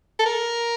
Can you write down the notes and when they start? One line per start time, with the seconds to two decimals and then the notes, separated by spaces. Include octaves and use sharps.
0.19 A4
0.26 A#4